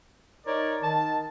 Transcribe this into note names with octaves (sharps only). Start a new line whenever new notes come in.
D#4 A#4 C#5 D5
D#3 A5